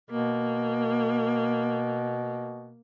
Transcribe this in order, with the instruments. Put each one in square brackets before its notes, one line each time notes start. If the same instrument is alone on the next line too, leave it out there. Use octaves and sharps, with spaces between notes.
[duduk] B2 [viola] A#3